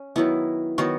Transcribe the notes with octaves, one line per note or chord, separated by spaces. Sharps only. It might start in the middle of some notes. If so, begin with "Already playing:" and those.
Already playing: C#4
D#3 F#3 B3 E4
D#3 F#3 B3 F#4